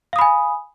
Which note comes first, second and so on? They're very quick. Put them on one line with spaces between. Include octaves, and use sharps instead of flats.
F5 D#6 B5 G#5